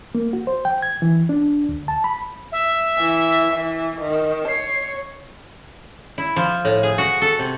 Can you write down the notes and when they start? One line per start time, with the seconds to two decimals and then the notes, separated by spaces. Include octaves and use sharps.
0.15 A#3
0.33 F#4
0.47 C5
0.65 G5
0.82 G#6
1.02 E3
1.29 D4
1.69 D2
1.88 A5
2.04 B5
2.52 E5
2.98 E3
3.53 E3
4.01 D#3
4.48 C#5 C7
6.18 E4
6.36 F3
6.65 A2
6.83 G#4
6.98 F#4
7.22 A4
7.39 C3